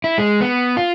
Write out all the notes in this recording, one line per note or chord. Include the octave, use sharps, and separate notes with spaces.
E4
G#3
B3
F4